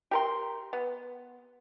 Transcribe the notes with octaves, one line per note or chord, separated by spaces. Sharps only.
G4 A#4 C6
B3